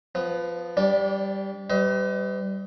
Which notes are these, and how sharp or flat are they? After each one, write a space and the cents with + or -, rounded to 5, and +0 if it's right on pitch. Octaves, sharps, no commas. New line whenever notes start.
F3 +0 B3 +20
G3 +0 D4 -30 D5 +0
G3 -10 B4 +45 D#5 +30